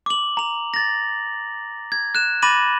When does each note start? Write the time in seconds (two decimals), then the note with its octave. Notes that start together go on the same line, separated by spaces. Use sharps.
0.06 D6 F#7
0.37 A#5 F7
0.74 A6 A#6
1.92 G#6
2.15 F#6 E7
2.42 B5 D6 A6 A#6 D#7 F#7